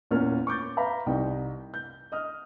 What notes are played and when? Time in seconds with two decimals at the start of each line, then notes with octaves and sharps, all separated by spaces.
0.11 E2 A#2 C#4 F4 A#4 F6
0.47 C#6 D6 G6 A6
0.77 B4 E5 F5 A#5 B5
1.06 C2 D#4 G5
1.74 G6
2.12 D#5 D#6 F6